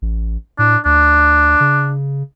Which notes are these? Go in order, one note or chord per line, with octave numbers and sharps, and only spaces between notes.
A1
A2 D4
D2 D4
C#3